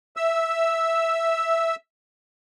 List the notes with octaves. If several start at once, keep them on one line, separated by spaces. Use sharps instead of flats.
E5 E6